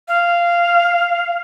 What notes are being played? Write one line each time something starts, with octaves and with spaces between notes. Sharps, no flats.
F5